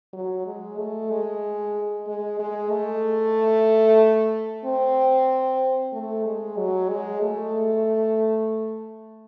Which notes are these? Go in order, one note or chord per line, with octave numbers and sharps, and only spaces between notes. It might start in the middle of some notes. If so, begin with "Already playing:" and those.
F#3
G#3
A3
G#3
G#3
G#3
A3
C4
A3
G#3
F#3
G#3
A3